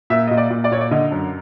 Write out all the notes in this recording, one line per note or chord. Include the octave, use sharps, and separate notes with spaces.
A#2 E5
A#2 D#5
D5
A#2
D5
A#2 C#5
D5
D3 D#5
F#2